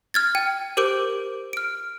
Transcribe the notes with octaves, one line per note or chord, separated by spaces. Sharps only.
F6 G#6 A6
G5 D#7
G4 A#4 C5 D6 G6 D7
F6 D7